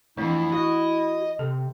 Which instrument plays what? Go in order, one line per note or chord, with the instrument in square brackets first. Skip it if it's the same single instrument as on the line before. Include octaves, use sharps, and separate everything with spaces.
[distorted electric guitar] F2 [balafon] E3 A3 D4 [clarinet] E4
[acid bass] F#4 [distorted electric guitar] D#5
[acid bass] C3 [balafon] A4